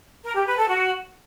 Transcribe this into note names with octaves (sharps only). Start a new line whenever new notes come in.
A#4
G4
B4
A4
F#4